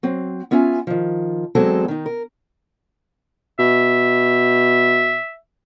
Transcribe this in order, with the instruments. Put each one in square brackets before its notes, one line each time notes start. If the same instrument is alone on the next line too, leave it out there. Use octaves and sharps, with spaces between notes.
[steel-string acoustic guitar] F#3 C4
B3 C#4 F4 E5 G5 G#5
D#3 F3
E2 F#3 G#3 C4 A4
D#3 D#4
A#4
[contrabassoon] B2 [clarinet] E5